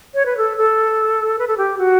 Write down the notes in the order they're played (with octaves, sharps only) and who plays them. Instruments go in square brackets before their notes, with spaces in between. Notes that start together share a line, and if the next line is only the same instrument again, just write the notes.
[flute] C#5
B4
A4
A4
B4
A4
G4
F#4